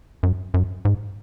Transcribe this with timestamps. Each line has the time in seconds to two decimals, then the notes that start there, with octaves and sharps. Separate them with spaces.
0.23 F#2
0.54 F#2
0.85 G#2